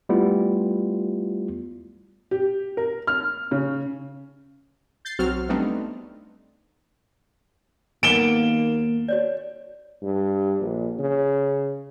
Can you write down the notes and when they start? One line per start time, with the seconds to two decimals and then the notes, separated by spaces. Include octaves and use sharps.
0.09 G3 A3 B3 E4 F4
2.31 G4
2.77 A#4
3.07 F6
3.51 C#3
5.05 G6 A6 C7
5.19 B1 F#3 C4 F#4 F6
5.49 G3 A3 B3 C4 D4 D#4
8.03 D#2 A#3 B3 D7 E7 G7
9.08 F#4 C#5 D5
10.02 G2
10.60 A#1
10.99 C#3